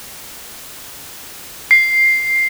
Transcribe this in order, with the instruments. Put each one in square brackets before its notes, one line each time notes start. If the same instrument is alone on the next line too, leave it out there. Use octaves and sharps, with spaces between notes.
[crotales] C7